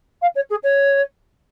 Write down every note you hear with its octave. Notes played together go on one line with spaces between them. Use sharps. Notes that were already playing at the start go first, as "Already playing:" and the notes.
F5
C#5
G#4
C#5